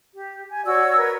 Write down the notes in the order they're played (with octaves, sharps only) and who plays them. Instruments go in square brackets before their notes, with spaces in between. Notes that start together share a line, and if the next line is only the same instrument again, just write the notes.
[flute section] G4
G#5
F#4 C#5 D5 E6
A#4 B4